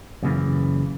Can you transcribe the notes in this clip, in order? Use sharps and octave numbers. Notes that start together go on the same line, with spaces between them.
F#2 A#2 C#3 E3